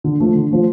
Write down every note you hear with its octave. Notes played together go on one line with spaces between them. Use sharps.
D3
F3 A3
D3
F3 A3